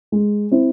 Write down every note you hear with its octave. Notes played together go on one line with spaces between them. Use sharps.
G#3
C4 E4